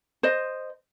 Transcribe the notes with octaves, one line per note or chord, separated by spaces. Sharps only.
C5 D#5